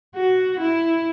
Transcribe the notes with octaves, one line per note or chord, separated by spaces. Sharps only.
F#4
E4